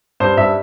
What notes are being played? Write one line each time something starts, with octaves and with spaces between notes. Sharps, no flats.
G2 C5
G2 E5